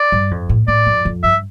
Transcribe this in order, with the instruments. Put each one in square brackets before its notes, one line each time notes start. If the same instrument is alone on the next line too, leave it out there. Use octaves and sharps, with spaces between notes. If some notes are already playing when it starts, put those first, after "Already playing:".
Already playing: [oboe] D5
[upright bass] G2
F2
A2
[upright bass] A2 [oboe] D5
[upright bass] F2
F2
[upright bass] G2 [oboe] E5